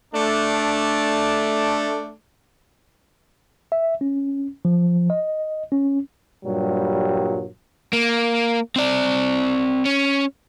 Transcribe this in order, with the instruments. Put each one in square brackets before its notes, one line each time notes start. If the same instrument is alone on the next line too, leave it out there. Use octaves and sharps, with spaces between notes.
[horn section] A3 D4
[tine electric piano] E5
C#4
F3
D#5
C#4
[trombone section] G2 A#2 F#3 G3
[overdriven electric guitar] A#3
C4 D5
C#4